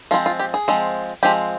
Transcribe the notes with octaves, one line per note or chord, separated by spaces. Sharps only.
F3 G#3 C4 F4
F4
G4
G#4
F3 G#3 C4
F3 G#3 C4 G4